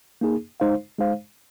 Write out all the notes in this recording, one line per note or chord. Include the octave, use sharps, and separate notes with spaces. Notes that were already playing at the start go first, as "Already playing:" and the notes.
A#3 D#4 G#4
G#3 D#4 C5 F5
G#3 D#4 C5 F5